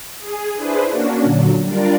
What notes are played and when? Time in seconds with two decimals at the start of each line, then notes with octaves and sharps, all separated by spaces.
0.18 G#4
0.56 D4 E4 G#4 B4 C5
0.90 A#3 C#4 D4 F#4
1.22 A#2 D3 F#3
1.64 G3 D4 F4 A#4 D5